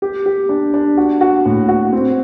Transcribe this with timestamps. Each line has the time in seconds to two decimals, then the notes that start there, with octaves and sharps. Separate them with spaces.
0.02 G4
0.26 G4
0.49 D4
0.74 D4
0.97 F#4
1.21 F#4
1.46 A2
1.68 F#4
1.93 C4